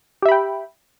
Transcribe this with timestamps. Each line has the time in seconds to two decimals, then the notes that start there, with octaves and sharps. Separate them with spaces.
0.22 G4
0.25 E5
0.29 B5
0.32 G5